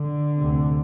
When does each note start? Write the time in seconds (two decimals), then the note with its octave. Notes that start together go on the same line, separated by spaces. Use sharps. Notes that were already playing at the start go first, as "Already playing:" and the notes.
Already playing: D3
0.37 D2 C3